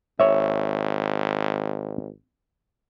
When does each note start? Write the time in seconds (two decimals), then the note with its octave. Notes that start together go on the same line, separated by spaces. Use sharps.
0.20 G#1 C#5 E5